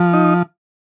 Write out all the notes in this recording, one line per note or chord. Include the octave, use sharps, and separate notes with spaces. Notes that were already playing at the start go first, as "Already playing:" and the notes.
Already playing: F3
D#4